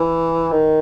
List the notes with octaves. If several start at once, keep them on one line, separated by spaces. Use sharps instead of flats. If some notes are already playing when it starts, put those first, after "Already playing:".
Already playing: E3
D#3